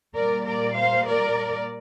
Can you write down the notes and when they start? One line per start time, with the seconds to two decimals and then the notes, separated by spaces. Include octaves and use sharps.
0.16 A#2 G3 A#3 A#4 D5
0.46 A#4 D5
0.77 C5 F5
1.08 A#4 D5